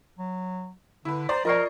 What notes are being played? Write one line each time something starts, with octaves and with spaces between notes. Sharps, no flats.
F#3
D3 E4 B4
C5 D5 A#5 A6
F3 F4 A#4 D5 D#5 C#6 C7